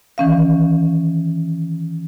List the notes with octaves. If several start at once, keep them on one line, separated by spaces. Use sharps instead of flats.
D#3 E3 C#4 F5